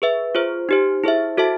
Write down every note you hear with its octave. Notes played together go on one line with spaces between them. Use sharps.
G#4 B4 E5
F4 G#4 C5
D#4 G4 C5
E4 G#4 C5 E5
F#4 A4 C5 E5 A5